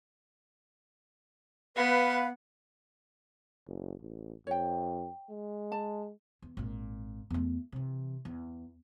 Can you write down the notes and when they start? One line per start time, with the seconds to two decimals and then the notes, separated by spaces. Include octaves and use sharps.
1.76 B3 B4 F5 F#5
3.67 F#1
4.01 A1
4.47 F2 C#5 G5
5.30 G#3
5.72 A5
6.42 E2
6.57 G#1 A#2
7.30 E2 A3
7.72 C3 E3
8.25 E2